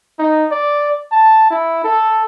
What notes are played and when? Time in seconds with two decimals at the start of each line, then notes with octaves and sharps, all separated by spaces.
0.19 D#4
0.51 D5
1.12 A5
1.50 E4
1.84 A4